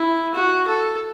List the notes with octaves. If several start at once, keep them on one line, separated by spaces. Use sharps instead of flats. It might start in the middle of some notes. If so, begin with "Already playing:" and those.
Already playing: E4
F#4
A4